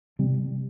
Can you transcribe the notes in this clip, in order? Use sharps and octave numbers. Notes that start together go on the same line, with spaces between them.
C3 G3 C4